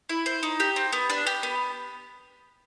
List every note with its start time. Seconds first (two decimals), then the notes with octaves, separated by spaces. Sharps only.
0.09 E4
0.26 C5
0.43 D#4
0.60 G4
0.76 C4
0.93 B3
1.10 D4
1.27 G4
1.43 B3